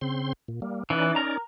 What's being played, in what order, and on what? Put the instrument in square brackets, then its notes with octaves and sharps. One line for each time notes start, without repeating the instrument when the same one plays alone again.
[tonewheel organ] C#3 C4 C6
A#2
G3 A#3
[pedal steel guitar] E3 B4 [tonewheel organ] C#4 D#4 D5
[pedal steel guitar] A#4 A#5